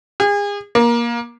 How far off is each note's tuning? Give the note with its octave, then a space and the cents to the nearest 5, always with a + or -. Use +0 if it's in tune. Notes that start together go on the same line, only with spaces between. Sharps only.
G#4 -35
A#3 +20